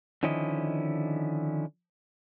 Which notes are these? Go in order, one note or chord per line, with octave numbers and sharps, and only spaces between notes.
D3 D#3 F3 C#4 E4 D#5